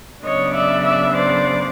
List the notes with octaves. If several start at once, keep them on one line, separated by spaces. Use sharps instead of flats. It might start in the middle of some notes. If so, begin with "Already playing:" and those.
C#3 F#3 B3 D4 C#5 D#5
D5 E5
D5 E5
C5 D5